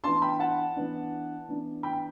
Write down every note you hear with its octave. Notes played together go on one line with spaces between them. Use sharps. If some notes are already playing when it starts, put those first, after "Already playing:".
E3 B3 D4 A5 C6
G5 B5
F#5 A5
E3 B3 D4
E3 B3 D4
G5 B5